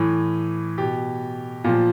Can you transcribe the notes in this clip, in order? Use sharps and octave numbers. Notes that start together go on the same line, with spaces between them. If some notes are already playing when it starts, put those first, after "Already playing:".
Already playing: A2 E3
B2 G4
A#2 F3